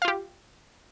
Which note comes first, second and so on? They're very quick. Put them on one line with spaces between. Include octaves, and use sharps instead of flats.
F5 F4 G4